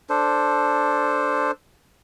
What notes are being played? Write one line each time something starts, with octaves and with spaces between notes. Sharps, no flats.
D4 A4 C5